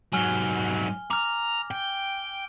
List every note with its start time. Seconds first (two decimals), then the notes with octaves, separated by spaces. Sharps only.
0.13 G#2 F#3 G#5 F6 G7
1.10 A#5 D6 F6
1.71 G5